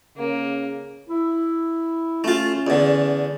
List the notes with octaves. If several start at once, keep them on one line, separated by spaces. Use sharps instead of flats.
C#3 A#3
E4
A3 C#4 F4
E2 D3